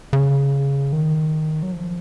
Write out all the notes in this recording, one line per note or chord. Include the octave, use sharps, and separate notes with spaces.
C#3
D#3
F#3
F3